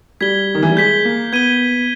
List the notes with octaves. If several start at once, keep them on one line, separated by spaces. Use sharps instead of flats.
G3 G#6 B6 G7
D#3
E3
G3
G#3 G6 B6 G7
A#3
B3 G#6 D#7 G7